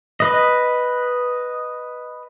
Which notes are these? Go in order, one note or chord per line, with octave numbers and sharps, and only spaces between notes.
B4 D#5